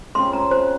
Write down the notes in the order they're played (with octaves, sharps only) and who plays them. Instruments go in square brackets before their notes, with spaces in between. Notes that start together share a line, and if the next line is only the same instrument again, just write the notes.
[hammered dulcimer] C#3 F3 C4 [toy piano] C6
[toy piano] A#5
C5